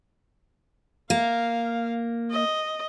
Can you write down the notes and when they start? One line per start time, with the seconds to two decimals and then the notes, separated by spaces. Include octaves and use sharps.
1.10 A#3 F5
2.30 D#5